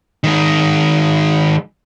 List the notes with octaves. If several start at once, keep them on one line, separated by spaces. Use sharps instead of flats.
D#3 G#3